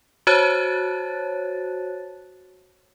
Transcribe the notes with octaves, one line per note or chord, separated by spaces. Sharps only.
F#4 C5 C#5 A5 F#6 A6